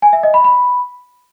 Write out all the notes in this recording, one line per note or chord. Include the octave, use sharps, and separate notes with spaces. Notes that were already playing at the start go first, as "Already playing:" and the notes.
G#5
E5
D#5
B5
B5